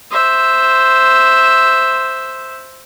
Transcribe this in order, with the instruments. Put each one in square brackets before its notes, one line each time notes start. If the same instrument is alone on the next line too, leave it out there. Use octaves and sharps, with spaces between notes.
[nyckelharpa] C5 E5